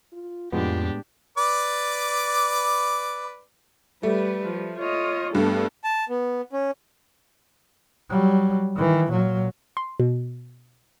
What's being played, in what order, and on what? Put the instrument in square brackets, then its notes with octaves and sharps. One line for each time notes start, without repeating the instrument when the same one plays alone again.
[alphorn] F4
[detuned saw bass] F2 [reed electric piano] A2 G#3 B3 [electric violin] D4 G4 [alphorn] F4
[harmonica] B4 D5 D6
[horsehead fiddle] G3 B4 [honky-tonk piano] A3
[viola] F3
[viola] F4 [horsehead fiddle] C#5 D#5
[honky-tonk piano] G2 [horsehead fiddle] G3 B3 [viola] A3 A4
[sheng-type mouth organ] A5
B3
C#4
[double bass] F#3 G3
D#3 E3
A#2 F#3
[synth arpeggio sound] C6
B2